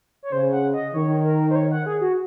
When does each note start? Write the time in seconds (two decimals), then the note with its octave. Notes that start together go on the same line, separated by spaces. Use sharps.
0.23 C#5
0.32 C#3 C5
0.53 F#5
0.73 D#5
0.94 D#3 C#5
1.25 A#4
1.51 C5
1.56 C#5
1.71 F#5
1.86 G#4
2.01 F#4